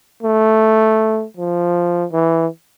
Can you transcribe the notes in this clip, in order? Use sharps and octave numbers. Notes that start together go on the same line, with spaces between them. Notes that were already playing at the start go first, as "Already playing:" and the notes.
A3
F3
E3